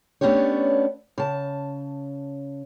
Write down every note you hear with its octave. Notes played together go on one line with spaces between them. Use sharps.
A3 B3 C#4 D4 G4 C#5
C#3 A5